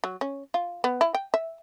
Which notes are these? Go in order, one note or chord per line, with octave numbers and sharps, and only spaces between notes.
F#3
C#4
F4
B3
E4
G5
E5